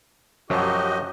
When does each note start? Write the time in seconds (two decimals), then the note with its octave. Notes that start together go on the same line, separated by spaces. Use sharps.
0.50 F#2 F3 F#3 F#4 G4 D#5